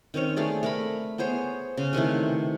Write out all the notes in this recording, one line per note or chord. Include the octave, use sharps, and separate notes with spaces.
D#3 C4 C#4 C#5
A3 G#4 D5
A3 A#4 B5
B3 G#4 C5 C#5
C#3
C3 D#3 E3 A3